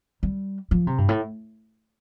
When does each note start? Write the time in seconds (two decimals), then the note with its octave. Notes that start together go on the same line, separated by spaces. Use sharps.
0.23 G3
0.71 F3
0.87 C3
0.98 G2
1.09 A2